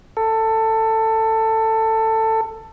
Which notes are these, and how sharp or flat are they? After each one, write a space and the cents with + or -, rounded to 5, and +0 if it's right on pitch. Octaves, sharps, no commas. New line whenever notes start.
A4 +15